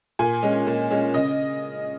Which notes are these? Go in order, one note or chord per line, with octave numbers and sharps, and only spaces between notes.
A#2 G#5
G#3 C#4
A#2
G#3 C#4
C#3 D#5